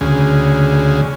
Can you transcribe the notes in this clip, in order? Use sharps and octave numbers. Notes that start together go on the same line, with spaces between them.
D2 C#3 G#4